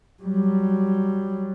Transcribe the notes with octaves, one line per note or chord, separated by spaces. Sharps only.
F#3 G3